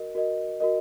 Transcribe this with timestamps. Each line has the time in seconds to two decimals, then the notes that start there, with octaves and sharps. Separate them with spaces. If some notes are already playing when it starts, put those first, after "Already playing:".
Already playing: F#4 A#4 D#5
0.15 F#4 A#4 D#5
0.60 F#4 A#4 D#5